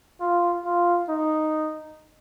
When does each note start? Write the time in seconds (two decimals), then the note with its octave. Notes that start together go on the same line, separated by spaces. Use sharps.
0.20 F4
0.64 F4
1.09 D#4